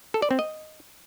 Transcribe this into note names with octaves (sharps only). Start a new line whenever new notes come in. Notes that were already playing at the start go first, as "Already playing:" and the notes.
A4
D5
C4
D#5